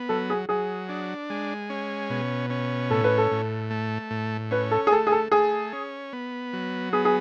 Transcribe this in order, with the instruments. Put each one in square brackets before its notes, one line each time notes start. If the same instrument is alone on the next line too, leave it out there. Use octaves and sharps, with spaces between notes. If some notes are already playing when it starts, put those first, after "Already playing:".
Already playing: [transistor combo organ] B3
[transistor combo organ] F#3 [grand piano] A4
[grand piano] G#4
[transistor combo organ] F#3 [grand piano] G#4
[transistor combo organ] D4
G#3
C#4
B2
C#4
[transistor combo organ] A2 [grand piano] A4
[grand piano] B4
A4
[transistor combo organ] A2
A3
A2
[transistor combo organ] C#4 [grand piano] B4
[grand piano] A4
G#4
[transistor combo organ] A3 [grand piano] A4
[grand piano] G#4
A4
[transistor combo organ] A3 [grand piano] G#4
[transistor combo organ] C#4
B3
F#3
[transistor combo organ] B3 [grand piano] G#4
[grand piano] G#4